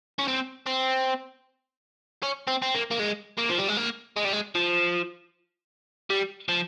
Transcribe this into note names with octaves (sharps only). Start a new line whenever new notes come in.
C#4
C4
C4
C#4
C4
C4
A#3
A#3
G#3
A#3
F3
G3
G#3
A#3
G#3
G3
G#3
F3
G3
F3